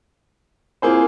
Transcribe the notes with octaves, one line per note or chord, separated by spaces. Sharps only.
A#3 C4 E4 F4 G#4 C5